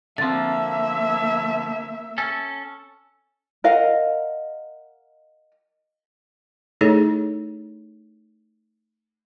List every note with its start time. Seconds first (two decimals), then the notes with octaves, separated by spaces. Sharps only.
0.18 D3 F3 A#3 C4 E5 A6
2.18 C#4 A4
3.64 A#4 D#5 F5 F#5
6.81 A3 D#4 E4 G#4 A4 C#5